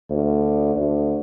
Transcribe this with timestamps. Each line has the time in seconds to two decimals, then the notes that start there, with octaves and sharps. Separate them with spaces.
0.10 D2
0.76 D2